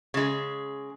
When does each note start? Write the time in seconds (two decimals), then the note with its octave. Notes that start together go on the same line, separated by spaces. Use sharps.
0.14 C#3 G#3